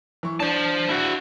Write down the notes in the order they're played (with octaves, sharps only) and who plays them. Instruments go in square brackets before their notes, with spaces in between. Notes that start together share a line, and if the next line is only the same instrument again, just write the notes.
[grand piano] E3 C#6
[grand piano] D4 [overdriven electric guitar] C5 A5
[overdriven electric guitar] E4 F#4